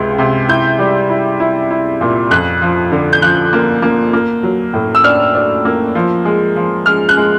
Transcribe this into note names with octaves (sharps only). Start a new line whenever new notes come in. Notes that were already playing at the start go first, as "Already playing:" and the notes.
Already playing: C#2 C3 G#3
C3
E4 G6
G3
E4
E4
E4
A#2
F2 F#6
F3
D3
G6
F3 F#6
A#3
A#3
A#3
F#3
A2
E6
D4 F6
D4
A#3
F3
G#3
F3
G#3 F6
F#6
G#3